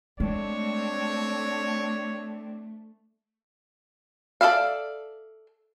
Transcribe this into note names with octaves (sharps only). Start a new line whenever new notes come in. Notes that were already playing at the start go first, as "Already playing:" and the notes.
G#3 A3 C4 D4 C#5
A4 D5 E5 F5